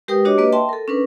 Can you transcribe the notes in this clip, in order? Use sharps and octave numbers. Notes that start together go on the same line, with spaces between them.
G#3 G4 A#4 B4 G5 D#6
D4 F#4 G4 C#5 D#5 D6
A#3 B4 D#5
E5 G5 A5 C6
A4 A#4
C#4 D4 A#4 B4